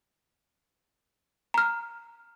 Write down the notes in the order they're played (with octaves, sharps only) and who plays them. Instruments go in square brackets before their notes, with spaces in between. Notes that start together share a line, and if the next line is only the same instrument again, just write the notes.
[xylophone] A#5 F6